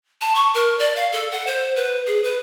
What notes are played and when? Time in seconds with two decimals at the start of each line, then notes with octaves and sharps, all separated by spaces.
0.21 A5
0.35 C#6
0.54 A#4
0.79 D5
0.96 F5
1.12 A4
1.32 F#5
1.47 C5
1.76 B4
2.07 G#4
2.24 B4